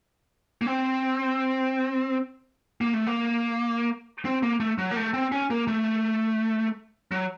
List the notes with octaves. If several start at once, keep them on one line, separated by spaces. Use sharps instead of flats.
A#3
C4
A#3
A3
A#3
C4
A#3
A3
F#3
A#3
A3
C4
C#4
A#3
A3
F#3